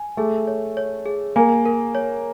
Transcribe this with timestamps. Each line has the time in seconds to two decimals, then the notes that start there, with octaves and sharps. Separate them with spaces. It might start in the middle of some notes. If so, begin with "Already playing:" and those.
Already playing: G#5
0.17 A3 G#4
0.47 C#5
0.77 C#5
1.06 G#4
1.36 A#3 G#5
1.66 A#4
1.95 C#5